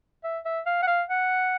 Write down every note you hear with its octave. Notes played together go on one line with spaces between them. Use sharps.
E5
E5
F5
F#5
F5
F#5